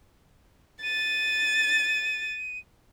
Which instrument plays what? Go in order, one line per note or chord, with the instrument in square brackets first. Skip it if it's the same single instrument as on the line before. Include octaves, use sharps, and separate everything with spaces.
[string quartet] A6 [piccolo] D#7